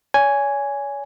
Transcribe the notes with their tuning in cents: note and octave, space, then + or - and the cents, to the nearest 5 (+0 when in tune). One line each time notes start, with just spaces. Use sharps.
C#5 +35 G#5 +0